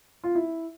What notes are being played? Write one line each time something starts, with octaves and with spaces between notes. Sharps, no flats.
F4
E4